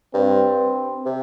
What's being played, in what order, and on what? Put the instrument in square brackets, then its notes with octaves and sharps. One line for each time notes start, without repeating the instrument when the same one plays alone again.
[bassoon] G2 [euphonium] C4
[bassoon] C3